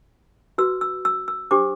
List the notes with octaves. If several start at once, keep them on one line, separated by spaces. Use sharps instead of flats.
F#4 B4 E6
E6
E6
E6
D4 G4 C5 D6